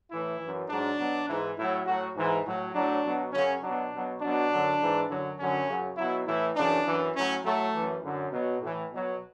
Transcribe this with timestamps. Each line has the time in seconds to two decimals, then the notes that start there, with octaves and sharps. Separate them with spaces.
0.11 A2 E3 E4
0.40 F#2 E3
0.69 G#2 F#3 D4
0.98 B2 F#3
1.28 G#2 E3
1.57 A2 F#3 E4
1.86 A2 F#3 F#4
2.16 G#2 E3
2.45 A2 F#3
2.75 A2 F#3 D4
3.04 B2 F#3
3.33 F#2 C#3 F#3 C#4
3.62 B2 F#3 D4
3.93 B2 F#3
4.21 B2 F#3 D4
4.51 F#2 D3 F#3
4.81 G#2 E3
5.10 F#2 D3 F#3
5.39 F#2 D3 F#3 C#4
5.68 F#2 C#3 F#3
5.97 B2 F#3 E4
6.27 A2 E3 E4
6.56 F#2 C#3 E3 D4
6.86 F#2 E3
7.15 A2 F#3 C#4
7.44 A2 F#3 A3
7.74 F#2 E3
8.03 F#2 D3 F#3
8.32 B2 F#3
8.62 A2 E3
8.91 B2 F#3